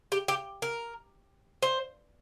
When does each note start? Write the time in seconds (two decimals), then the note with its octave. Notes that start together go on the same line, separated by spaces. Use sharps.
0.12 G4
0.28 G4
0.62 A#4
1.62 C5